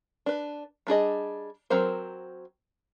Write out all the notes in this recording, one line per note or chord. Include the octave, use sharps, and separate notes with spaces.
D4 B4
G3 D4 G#4 D#5
F#3 C4 A#4 C5